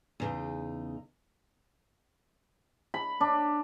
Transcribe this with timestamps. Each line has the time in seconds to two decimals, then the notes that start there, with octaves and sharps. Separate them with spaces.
0.20 E2 C#3 D#4
2.94 B5
3.21 D4